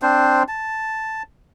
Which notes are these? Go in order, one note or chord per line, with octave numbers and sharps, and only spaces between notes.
C4 D4 C5
A5